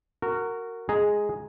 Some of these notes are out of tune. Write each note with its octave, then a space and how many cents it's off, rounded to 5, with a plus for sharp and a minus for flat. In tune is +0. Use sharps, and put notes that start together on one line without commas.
F#4 +0 A#4 -20
G#3 +0 G#4 +0 A#5 +0